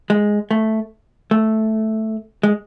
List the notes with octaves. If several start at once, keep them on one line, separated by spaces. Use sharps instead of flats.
G#3
A3
A3
G#3